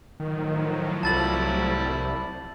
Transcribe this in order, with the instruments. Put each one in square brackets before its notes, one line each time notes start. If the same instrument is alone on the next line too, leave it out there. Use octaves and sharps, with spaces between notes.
[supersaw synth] A2 F3 F#3 [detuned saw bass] D#3
[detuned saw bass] C2 [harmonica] G3 E4 [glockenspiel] A5 A6 F#7